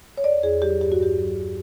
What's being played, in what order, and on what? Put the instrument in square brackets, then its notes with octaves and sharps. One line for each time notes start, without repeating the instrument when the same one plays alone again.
[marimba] C#5
E2 D5
E2 G#4
F#3 G4
G2 G4
F#4
G2 G4
F#3